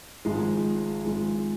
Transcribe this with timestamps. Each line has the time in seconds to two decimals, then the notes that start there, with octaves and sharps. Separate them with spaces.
0.25 G#1 G#2 F3 G#3
1.05 G#1 G#2 F3 G#3